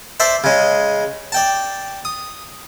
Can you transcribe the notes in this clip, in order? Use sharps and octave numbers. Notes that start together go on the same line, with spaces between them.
C5 D5 E5 A5
C#3 G#3
D5 G5 A5
D#6